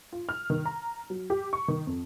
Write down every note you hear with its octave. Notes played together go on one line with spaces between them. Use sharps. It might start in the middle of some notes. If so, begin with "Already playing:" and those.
F4
F6
D#3
A#5
F#3
G4
C#6
D#3
F2